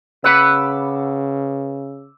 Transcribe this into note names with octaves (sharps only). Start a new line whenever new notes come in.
C#3 B4 F#5 B5 D6 E6